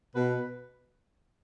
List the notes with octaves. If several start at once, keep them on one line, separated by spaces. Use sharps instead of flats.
B2 B4